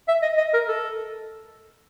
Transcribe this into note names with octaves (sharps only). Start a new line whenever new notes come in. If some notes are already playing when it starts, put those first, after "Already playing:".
E5
D#5
D#5
A#4
A4